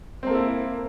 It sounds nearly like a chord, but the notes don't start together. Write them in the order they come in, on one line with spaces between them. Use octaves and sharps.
C4 A#3 A4 E4